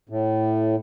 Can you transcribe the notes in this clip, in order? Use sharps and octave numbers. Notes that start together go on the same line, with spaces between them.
A2